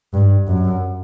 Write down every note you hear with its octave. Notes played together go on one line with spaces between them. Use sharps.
G2
F#2